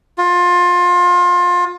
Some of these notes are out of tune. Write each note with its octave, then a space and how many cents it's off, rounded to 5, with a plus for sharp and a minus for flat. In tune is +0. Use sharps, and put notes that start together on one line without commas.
F4 +25